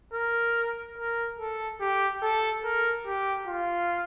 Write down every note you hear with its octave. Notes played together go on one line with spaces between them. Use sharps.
A#4
A#4
A4
G4
A4
A#4
G4
F4